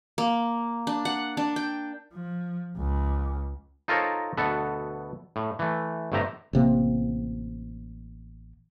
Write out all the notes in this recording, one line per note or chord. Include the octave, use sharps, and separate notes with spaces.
A#3
D4
F#5
D4
G5
F3
C#2
D#4 F4 A4 A#4 C5 C#5
D2 B2 B3 A4 F#5
A2
E3 A3
G1 A2 C3 E5 G5 A#5
A1 C3 A#3